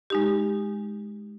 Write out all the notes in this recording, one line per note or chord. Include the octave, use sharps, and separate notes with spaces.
G#3 D#4 G4